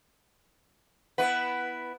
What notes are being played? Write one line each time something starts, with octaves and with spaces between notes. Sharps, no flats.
B3 E4 B4 F#5